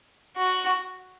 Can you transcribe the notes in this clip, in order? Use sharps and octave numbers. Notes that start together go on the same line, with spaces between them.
F#4